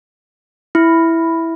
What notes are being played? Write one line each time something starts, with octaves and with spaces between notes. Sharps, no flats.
E4